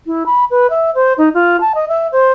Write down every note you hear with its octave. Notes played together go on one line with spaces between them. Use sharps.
E4
B5
B4
E5
C5
D#4
F4
A5
D#5
E5
C5